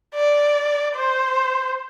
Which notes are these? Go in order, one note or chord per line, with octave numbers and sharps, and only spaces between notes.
D5
C5